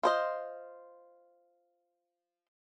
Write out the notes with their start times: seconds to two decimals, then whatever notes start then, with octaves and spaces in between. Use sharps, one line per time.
0.03 F4 C5 D#5